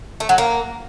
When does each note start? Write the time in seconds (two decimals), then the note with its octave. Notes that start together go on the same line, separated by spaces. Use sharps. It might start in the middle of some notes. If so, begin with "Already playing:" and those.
0.20 A3
0.29 F#3
0.38 A#3